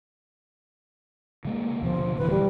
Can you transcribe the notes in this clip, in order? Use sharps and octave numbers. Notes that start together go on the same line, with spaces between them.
C#3 G#3 A#3
D#2 B2 D3 F3
D1 D3 E3 B4
G3